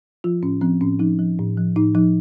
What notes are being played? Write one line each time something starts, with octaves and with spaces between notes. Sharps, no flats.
F3 F4
A2 C#4
F3 C4
A2 C#4
F3 D#4
F3
A2
F3
A2 D#4
F3 D#4